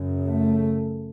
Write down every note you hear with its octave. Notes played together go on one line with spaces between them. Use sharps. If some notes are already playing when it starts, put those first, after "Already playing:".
Already playing: F#2 C#3
A3